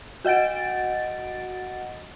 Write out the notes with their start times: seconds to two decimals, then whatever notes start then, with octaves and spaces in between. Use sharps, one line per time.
0.25 F#4 D#5 F#5 A6 D7